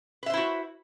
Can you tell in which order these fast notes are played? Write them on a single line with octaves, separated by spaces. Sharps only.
B4 E5 C5 E4 F#4